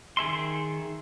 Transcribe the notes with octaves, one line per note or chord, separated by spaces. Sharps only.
D#3 G#4 E5 C6